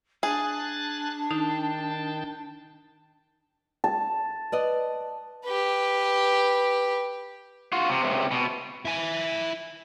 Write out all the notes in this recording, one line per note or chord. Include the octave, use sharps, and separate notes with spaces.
D4 G#4 G#5 F#6 A6
D#3 D#4 G5 A5
A5
B4 D5 D#5
G4 B4
F4 F#4
C3
C#2 C3
B2
E4 G#5